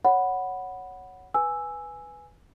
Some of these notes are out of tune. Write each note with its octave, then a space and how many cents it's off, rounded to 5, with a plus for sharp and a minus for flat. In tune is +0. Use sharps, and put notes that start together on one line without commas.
C#5 +0 F#5 +0 B5 +0
B4 +0 G#5 +0 E6 +0